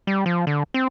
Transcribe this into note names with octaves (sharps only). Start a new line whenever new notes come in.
G3
F3
D3
C4